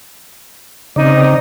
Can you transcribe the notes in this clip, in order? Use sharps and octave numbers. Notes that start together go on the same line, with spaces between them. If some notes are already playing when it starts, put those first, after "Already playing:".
C#3 C4 D#4 D5